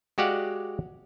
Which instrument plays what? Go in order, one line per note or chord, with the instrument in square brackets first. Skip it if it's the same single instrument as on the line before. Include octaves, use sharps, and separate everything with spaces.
[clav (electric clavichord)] G#3 F#4 G4 D5 F5 F#5